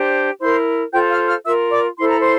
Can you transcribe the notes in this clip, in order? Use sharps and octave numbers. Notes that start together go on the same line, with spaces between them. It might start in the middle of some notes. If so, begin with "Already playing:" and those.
Already playing: D4 G4 C5
E4 A#4 C5 C6
F4 A4 C5 G5 G6
F5 F6
F5 F6
F4 A#4 E5 E6
D5 D6
E4 A4 C5 C6
A#5
C5 C6